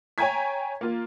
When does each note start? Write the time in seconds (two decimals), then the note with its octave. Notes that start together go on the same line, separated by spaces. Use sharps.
0.18 C#5 G5 G#5 A#5 G#6 B6
0.81 A#3 F4